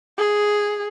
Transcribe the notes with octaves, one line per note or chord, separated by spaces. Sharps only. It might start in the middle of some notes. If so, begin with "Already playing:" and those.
G#4